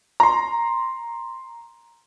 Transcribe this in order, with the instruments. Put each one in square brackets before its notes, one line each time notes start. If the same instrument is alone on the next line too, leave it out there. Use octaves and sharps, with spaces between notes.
[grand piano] A#5 C6